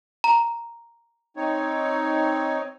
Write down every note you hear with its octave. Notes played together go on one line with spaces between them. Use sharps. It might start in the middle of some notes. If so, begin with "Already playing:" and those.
A#5
C4 D#4 C#5